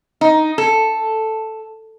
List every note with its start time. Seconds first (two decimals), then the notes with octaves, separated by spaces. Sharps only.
0.21 D#4
0.58 A4